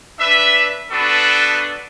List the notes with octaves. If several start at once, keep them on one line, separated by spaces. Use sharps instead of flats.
D4 B4 E5
B3 D4 F#4 A4 B4